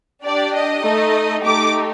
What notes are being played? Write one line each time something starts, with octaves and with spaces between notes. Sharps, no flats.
D4 G4 D5
D#5
A3 D#4 A4
A3 D#4 G4 D6